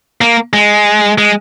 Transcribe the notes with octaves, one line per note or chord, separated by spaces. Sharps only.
A#3
G#3
G#3